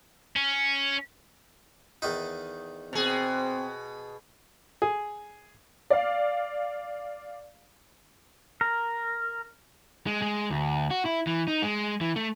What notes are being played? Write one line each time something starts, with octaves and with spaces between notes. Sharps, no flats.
C#4
E2 D#3 D#4
B2 C4 G#4
G#4
D5 F5
A#4
G#3
G#3
D2
F#4
E4
E3
D#4
G#3
E3
A3